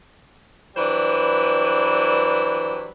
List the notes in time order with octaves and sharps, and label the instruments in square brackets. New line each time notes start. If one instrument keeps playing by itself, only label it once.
[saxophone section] E3 F#3 G3 D4 B4 C5